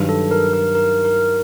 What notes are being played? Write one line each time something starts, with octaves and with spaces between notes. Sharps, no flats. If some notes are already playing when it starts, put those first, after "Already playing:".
Already playing: G2 D#3 F#3
A4
A#4
A#4
A#4
A#4